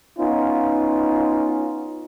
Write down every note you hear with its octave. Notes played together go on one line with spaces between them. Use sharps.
B3 C#4 D#4 F4